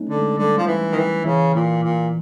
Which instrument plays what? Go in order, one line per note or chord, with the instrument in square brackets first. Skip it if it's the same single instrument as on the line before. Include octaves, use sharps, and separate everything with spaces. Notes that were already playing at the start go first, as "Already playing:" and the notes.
Already playing: [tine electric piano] A3 C#4 D#4
[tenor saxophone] D3
[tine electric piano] G#3
[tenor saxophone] D3 [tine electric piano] G3
[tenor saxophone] F3
E3
D#3
E3
[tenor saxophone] C#3 [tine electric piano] E3
[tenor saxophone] A#2
A#2